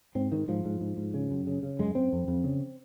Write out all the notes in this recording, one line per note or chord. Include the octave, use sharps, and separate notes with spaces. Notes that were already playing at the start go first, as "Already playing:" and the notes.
G#2 C4
G#2 D#3
G#2 F3
G#2
G#2
G#2
C#3
F#2
C#3
C#3
F#2 G#3
F#2 C4
F2
F2
C#3